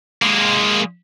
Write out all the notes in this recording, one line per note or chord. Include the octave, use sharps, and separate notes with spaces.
G#3 A#3